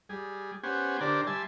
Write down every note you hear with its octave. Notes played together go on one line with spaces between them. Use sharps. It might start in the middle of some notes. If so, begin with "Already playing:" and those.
G3 G#4
B3 C#4 G4 C5 F#5 G#5
D3 D4 G4 A#4 C5 D5
G3 E5 G#5 A5 C6